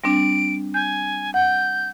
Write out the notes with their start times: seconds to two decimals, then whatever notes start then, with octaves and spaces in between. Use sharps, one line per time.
0.04 G3 C4 D4 D7
0.74 G#5 G6
1.34 F#5 G6